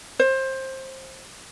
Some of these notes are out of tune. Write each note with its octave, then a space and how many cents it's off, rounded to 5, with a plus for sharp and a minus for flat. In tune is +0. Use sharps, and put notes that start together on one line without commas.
C5 +20